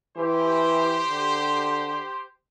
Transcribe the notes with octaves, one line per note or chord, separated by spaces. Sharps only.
E3 G4 C5
D3